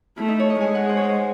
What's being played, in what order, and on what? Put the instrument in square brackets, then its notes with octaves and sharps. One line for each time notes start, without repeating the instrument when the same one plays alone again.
[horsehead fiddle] A3 [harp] E4
[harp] D#4
C#5
D#5
[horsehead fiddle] G#3 [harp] G#5
[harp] F#5
C5
C#5
C5